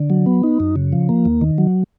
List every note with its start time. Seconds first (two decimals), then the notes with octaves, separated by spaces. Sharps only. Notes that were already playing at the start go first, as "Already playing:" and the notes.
Already playing: D3
0.10 F#3
0.26 B3
0.43 D#4
0.60 F#2
0.76 C#3
0.93 F3
1.09 A#3
1.25 D#2
1.41 D#3
1.58 F#3